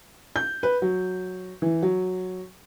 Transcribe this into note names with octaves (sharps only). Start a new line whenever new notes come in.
G6
B4
F#3
E3
F#3